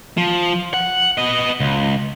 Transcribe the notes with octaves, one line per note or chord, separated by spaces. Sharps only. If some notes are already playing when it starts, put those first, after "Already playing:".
F3
F#5
B3 D#5
C#2